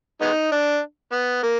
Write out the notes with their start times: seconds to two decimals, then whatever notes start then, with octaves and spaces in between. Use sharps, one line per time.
0.21 G#3 B3 D#4
0.52 D4
1.12 B3
1.43 A#3